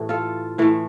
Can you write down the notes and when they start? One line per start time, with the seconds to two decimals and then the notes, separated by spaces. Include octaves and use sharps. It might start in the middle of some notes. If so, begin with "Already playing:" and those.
Already playing: A2 E3 A3 G4
0.09 F4 A4
0.58 A2 E3 A3